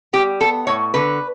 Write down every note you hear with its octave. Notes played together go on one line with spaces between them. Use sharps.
G3 G4
B3 A4
A2 C#5
D3 B4